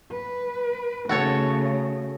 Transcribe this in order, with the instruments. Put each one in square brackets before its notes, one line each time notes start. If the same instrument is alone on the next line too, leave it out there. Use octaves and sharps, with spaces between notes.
[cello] B4
[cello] C#3 A3 [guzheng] F#4 A4 C#5